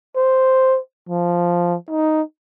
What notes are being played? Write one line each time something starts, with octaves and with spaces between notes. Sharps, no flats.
C5
F3
D#4